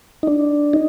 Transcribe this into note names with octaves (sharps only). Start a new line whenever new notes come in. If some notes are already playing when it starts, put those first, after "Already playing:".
D#4
D4
D#4